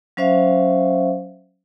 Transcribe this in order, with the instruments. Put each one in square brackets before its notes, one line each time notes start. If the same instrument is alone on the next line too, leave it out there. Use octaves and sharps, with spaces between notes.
[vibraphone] F#3 C#4 C5 E5 F5